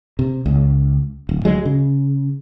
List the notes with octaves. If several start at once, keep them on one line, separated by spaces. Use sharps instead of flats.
C3
C#2
D1
D2 F#3 G#3
C#3